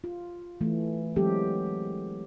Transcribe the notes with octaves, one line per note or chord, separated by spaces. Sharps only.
F4
E3 A3
E3 F#3 G#3 C4 G4 A4